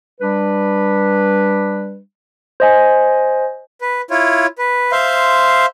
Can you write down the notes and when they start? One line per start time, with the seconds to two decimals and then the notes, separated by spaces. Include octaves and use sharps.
0.21 G3 D4 B4
2.60 C5 D#5 G#5
3.81 B4
4.10 E4 F4 C#5
4.58 B4
4.92 C5 E5 F5 C6